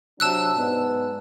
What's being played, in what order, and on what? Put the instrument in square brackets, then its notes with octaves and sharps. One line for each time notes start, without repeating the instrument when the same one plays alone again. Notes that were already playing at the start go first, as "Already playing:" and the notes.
[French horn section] C3 F#3 D4 [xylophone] A5 E6 F#6
[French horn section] G#2 B3 D5